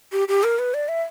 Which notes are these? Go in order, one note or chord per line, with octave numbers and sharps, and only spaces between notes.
G4
G4
A#4
B4
D5
E5